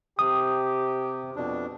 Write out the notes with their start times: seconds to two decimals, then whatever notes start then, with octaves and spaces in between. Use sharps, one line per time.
0.19 C3 G4 D#6
1.36 F2 B2 D4